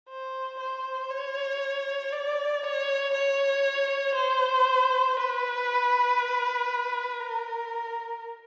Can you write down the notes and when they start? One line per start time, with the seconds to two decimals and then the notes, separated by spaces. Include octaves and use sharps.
0.09 C5
0.60 C5
1.10 C#5
2.12 D5
2.63 C#5
3.14 C#5
4.15 C5
5.17 B4
7.19 A#4